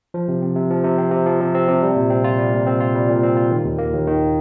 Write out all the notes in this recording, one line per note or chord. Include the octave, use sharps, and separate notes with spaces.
F3
C3
C4
C3
F3
C3
C4
C3
F3
C3
C4
C3
G3
A#2
C4
F4
G3
A#2
C4
F4
G3
A#2
C4
F4
D#3
D#2
A#3
D#2
D#3